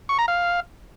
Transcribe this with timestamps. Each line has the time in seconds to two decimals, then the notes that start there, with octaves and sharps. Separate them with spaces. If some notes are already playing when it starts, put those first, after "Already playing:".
0.09 C#6
0.19 A#5
0.28 F5